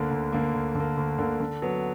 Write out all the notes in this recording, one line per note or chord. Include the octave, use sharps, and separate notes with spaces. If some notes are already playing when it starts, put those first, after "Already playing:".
Already playing: D2 D3 A#3
D2
D3 A#3
D2
D3 A#3
D2
D3 A#3
D3
F#3 B3